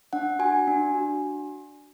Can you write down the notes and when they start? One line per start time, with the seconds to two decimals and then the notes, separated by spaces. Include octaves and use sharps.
0.13 D4 F#5
0.39 F#4 G#5
0.67 D4
0.94 F#4